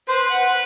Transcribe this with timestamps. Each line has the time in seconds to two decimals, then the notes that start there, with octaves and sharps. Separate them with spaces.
0.08 B4 C5
0.31 F#5